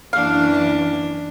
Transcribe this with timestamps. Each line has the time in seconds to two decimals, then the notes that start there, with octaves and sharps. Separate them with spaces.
0.13 F#2 E3 A#3 D4 F5